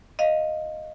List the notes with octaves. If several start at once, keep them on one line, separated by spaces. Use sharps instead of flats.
D#5 F5